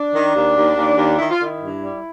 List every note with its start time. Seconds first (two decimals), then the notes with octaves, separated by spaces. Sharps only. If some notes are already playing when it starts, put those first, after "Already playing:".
Already playing: D4
0.14 D#3
0.35 D#2
0.56 D#2
0.76 D#2
0.97 D#2
1.19 D#3 E4
1.30 F4
1.39 D#3 E4
1.60 G2
1.81 G3